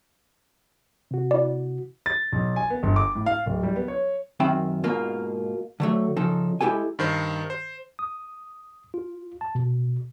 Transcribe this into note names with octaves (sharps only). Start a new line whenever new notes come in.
C3 F#4
E4 D5
A6
B1
G#5
B3
G1
D6
A2
F5
D1
G3
B3
C#5
F#2 D#3 C4 E5 G5 B5
G#2 B2 A#3 F4
D3 F#3 A3
C#3 F3 D#4 A4
G#3 E4 G4 A4 G#5
G2 D#3 C5
C5
D#6
F4
A5
B2